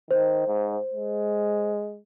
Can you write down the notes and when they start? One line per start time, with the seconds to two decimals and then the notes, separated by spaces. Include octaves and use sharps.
0.11 D#3 C5
0.48 G#2
0.93 G#3